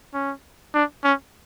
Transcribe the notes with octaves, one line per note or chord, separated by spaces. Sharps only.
C#4
D4
C#4